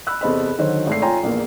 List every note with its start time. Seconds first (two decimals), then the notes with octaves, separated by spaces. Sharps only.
0.07 B5 E6 F#6
0.21 E2 C3 A4 C5 D#5 B5
0.58 D3 D#3 F#3 F#4 C5 C#5
0.87 G#1 A3 C7
1.02 F4 C#5 G5 G#5 A#5 C6
1.23 A#1 E2 A#3